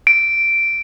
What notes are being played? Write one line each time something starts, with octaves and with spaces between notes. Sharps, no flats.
D7